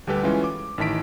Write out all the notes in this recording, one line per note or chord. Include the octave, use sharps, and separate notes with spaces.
D2 G3 G4 A4 B4 G5
E3 G#3 C#4 F4
D6
A1 D#3 E4 A5 B6 D7